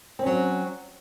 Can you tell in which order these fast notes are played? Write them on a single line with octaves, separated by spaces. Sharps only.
C4 C#4 F#3